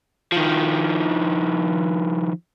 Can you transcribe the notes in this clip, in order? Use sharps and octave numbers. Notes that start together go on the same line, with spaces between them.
D#3 F3